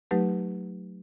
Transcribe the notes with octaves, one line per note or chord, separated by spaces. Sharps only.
F#3 A3 D#4 G4 B4